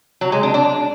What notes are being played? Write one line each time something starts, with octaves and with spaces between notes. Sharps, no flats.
F#3
G#3
D4
D4